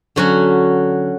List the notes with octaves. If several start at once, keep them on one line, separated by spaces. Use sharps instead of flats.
D3 F#3 C#4 F#4